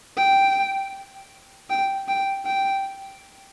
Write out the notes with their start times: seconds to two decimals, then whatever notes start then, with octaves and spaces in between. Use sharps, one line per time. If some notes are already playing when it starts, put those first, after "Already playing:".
0.17 G5
1.70 G5
2.08 G5
2.46 G5